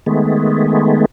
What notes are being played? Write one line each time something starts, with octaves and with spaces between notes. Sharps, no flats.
D#3 G#3 A3 B3